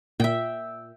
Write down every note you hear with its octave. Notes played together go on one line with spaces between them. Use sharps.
A#2 E5 G5